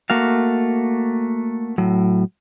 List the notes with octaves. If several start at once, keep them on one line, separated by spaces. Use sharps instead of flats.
A3 A#3 F#4 F5
A2 F#3